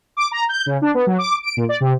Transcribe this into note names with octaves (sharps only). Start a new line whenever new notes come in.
D6
A#5
G6
C#3
D4
B3
F#3
D6
D7
A#2
D5
C3